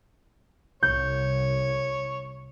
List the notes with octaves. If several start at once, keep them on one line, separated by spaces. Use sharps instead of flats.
C2 C#5 G6